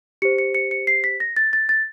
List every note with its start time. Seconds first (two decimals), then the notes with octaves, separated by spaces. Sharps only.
0.22 G4 C5 C#7
0.38 C#7
0.55 C#7
0.71 C#7
0.87 C7
1.04 B6
1.20 A#6
1.37 A6
1.53 A6
1.69 A6